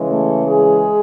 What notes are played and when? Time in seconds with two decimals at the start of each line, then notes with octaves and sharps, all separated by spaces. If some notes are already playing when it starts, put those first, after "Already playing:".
Already playing: C#3 E3 G#3
0.09 A3
0.45 G#3 G#4